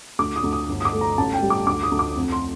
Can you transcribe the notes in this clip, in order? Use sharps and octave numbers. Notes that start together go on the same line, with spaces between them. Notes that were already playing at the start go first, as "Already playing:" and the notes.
D2 D6
D#6
D2
D#6
G1
D#6
D6
A3
A#5
A1 A5
G5
G3
D6
D2 D6
D#6
D2
D6
F2
C6